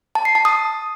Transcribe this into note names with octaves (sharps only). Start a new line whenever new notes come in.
A5
C7
A5
D#6